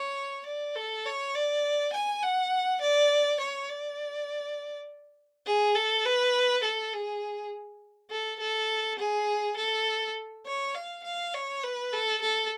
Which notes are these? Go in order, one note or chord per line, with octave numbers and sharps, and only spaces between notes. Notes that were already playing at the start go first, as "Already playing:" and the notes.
Already playing: C#5
D5
A4
C#5
D5
G#5
F#5
D5
C#5
D5
G#4
A4
B4
A4
G#4
A4
A4
G#4
A4
C#5
F5
F5
C#5
B4
A4
A4